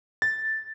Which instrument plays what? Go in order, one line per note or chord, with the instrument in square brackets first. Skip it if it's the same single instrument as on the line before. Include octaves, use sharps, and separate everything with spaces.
[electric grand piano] A6